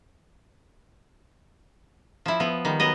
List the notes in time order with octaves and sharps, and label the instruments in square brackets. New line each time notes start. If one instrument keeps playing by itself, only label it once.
[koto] F3 E4
F3 B3
D#3 G3
F#3 B3 D#5